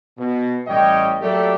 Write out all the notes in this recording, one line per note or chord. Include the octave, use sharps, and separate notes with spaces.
B2
A1 G3 C#5 D#5 G5
F#3 A3 A#3 G4 A4 D5